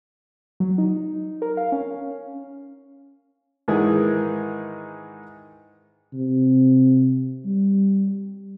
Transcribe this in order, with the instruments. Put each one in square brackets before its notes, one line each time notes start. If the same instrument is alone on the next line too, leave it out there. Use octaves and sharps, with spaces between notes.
[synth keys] F#3
D#4
A#4
F5
C#4
[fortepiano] G#2 D#3 E3 G#3 D#4 G#4
[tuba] C3
G3